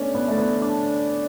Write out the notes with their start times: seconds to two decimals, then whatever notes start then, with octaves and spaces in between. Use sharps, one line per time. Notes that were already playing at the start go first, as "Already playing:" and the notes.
Already playing: A3 B3 C#4 D4
0.15 B3
0.28 A3
0.38 B3
0.61 D4